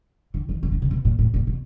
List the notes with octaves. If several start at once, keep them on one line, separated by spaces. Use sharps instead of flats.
D3
D#3
D3
C#3
C#3
B2
A#2
A2
A#2
B2